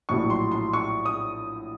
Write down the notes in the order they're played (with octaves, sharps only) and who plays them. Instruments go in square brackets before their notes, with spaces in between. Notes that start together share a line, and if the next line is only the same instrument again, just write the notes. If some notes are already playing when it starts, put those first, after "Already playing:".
[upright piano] A#1 A2 F#3 C#6
C6
C6
C#6
D#6